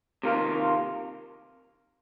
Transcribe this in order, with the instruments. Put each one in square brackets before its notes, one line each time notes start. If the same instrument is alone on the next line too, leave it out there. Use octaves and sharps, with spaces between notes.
[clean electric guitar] C3 D#3 A#3 F4